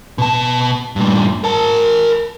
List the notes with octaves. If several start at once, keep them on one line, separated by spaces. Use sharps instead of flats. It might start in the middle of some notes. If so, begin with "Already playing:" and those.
B2 A5
G2 A#2
A#4 A5